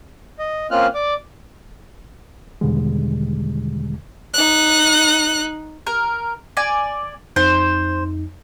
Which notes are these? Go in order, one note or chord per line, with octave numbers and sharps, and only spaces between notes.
D#5
A#3 C4 C#4 F4 F6 F#6
D5 D6
E2 B2 D3 D#3 G3 G#3
D#4 F#6
A#4
D5 G#5
F2 D#4 C5